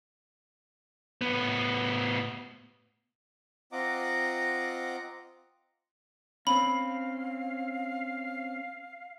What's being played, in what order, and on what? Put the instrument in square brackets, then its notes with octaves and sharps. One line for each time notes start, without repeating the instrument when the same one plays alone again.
[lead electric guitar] A2 B3
[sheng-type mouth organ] C4 F4 D#5 F#5 A#5 D6
[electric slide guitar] C4 C#4 [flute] F5 [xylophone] B5